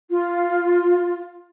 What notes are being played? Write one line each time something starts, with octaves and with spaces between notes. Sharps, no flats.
F4